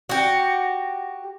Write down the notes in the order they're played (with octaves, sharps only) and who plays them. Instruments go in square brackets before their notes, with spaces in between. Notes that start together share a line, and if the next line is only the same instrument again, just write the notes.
[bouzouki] F#4 G4